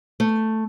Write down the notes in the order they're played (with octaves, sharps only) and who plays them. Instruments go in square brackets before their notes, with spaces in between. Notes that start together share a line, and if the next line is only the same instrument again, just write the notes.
[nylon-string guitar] A3